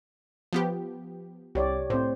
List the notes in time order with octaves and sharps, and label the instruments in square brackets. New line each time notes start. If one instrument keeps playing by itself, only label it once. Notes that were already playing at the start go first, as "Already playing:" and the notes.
[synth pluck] F3 B3 G4
[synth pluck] C2 [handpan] G4 C#5 D5
[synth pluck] A2 [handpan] C4 C5